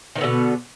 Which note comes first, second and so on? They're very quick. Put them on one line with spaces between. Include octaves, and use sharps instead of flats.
D#3 B3 D3 B2